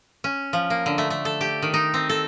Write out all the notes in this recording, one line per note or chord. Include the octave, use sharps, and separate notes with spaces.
C#4
F3
A#3
D3
A3
A3
A4
G4
D#3
D#4
C4
A4